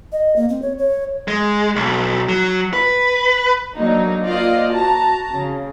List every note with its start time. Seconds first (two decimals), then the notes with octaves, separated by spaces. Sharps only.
0.12 D#5
0.36 A#3
0.49 C4
0.62 C#5
0.78 C#5
1.28 G#3
1.76 B1
2.29 F#3
2.73 B4
3.76 F#3 A#3 D4 D#4
4.23 A#3 F4 C5 D5 D#5 F5
4.71 F#4 A5 A#5
5.33 C#3